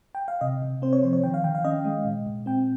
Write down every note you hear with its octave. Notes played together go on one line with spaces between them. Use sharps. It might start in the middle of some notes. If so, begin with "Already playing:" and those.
G5
F5
C3 D#5
C3
C4 C5
C#5
F3 C5
C#5
D#3 G5
F5
D#3 G5
F5
C#4 D#5
G#3
A#2
A#2
C4 G5